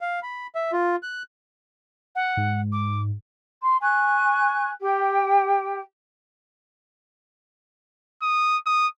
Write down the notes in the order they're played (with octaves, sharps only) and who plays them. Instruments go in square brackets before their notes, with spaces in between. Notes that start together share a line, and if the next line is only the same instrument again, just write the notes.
[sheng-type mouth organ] F5
B5
E5
F4
F#6
[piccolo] F#5
[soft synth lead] G#2
[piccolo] D6
[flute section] C6
G#5 C#6 F#6
G4 G5
[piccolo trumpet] D#6
D#6